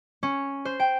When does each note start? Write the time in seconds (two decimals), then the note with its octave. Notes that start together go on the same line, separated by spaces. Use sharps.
0.23 C#4
0.65 C5
0.80 G5